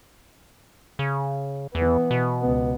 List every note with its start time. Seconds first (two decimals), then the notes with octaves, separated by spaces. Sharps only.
0.99 C#3
1.75 E2 E3 B3
2.11 B2
2.42 C#2 B3